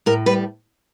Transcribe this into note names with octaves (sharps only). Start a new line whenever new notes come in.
A2 A#4
G3 B4